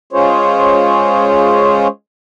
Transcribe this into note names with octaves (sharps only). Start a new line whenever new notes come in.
G#3 C#4 F4 G#4 C5 C#5